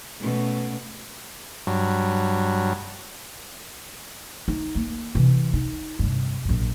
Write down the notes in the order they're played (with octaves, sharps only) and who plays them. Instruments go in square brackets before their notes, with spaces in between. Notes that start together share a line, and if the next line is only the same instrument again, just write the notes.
[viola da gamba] B2 A3 C#4
[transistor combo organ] G2 F#3
[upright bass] D#4
A#3
C3 E3
D#4
G2 C3
A#1 F#2